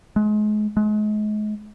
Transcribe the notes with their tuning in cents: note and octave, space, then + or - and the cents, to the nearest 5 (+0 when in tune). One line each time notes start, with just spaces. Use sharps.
G#3 +35
G#3 +35